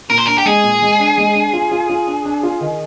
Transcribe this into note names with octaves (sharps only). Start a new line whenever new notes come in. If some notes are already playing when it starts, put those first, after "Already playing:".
A#2 A#4
C5
D4 A#4
G4
G#3 G#4
A#2
G#3
D4
G#3
D4
F4
F4
F4
D4
D4
F4
D#3